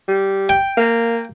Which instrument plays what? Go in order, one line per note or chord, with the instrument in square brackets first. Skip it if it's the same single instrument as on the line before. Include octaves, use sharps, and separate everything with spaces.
[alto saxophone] G3
[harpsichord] G5
[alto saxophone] A#3